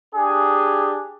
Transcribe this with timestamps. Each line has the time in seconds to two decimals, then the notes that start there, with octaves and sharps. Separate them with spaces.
0.15 D4 G4 G#4